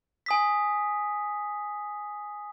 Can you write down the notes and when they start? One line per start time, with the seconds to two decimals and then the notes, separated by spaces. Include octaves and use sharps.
0.26 G#5 D#6 B6